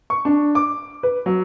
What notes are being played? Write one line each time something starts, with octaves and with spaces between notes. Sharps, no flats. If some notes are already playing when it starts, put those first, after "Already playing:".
C#6
D4
D6
B4
F#3